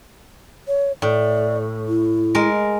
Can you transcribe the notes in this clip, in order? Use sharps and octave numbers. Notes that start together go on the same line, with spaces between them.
C#5
A2 D5
E4
G#3 A#4